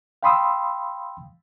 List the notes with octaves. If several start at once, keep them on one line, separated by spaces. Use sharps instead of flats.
F5 G5 B5 C6 D#6 E6